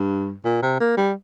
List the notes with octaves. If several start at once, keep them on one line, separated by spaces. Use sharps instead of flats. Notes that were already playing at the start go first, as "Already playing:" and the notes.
Already playing: G2
A#2
C3
A#3
G3